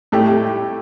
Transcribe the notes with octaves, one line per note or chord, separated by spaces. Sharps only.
A2 A3 G4